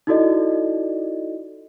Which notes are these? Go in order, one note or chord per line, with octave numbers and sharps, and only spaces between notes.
D#4 E4 F#4 A4 D5 D#5